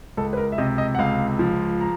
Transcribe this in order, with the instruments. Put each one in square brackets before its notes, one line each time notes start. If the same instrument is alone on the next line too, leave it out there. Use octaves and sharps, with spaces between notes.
[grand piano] C#2 A4
B4
A#4
E5
C3 D#5
D#5
F#5
C#2 F5
F3
A#5